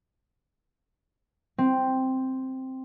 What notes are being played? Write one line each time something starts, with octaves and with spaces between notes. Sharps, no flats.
C4